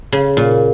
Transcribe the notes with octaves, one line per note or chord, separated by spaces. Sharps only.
C#3
A#2